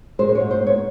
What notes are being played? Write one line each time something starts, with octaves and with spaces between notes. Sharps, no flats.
G#3 C5
C5
C#5
G#2
C5
B3
C#5